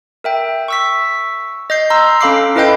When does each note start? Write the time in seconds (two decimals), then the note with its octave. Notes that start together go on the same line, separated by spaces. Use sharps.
0.24 A#4 E5 G5
0.68 C#6 E6 B6
1.70 D#5 G6 C7
1.90 A#5 C6 E6 F6
2.21 C#4 A4 F5 B5 D6 C7
2.56 E4 A4 B4 D#5 G5 G6